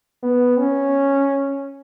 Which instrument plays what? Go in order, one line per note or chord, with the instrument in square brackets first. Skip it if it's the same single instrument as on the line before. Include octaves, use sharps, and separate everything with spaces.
[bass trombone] B3
C#4